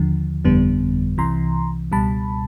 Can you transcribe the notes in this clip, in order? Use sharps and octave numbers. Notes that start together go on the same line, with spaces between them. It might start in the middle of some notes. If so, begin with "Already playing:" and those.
Already playing: D#2 D3 F3
G1 F2 D3 G3 B3
C2 C3 E3 A#5 C6
C#2 B2 G3 A5 B5